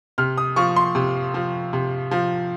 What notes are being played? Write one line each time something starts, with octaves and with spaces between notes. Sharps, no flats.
C3 F6
D#6
F3 C#6
C6
C3
F3
C3
F3